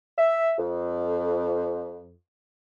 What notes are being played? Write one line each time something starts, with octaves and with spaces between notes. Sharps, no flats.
E5
F2